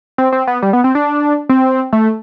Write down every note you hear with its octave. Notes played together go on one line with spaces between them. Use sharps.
C4
C4
B3
G3
B3
C4
D4
C4
A3